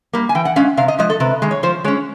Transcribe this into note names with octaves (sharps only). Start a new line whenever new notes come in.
G3 A#3
G#5
E3 G5
F#5
G#3 C#4 F5
C3 F5
D#5
F3 G#3 D#5
A4
C3 B4
D#3 G#3
C#5
F3 C5
G#3 C#4 C#5